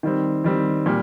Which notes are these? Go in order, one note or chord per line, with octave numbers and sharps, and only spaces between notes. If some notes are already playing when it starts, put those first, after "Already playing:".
D#3 G3 C4
D#3 G3 C4
A#2 G3